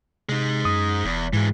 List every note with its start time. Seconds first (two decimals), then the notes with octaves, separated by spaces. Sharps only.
0.29 C3 G#3 D#4
0.65 F#2 D#6
1.05 E1 E2
1.33 G#2 E3 G#3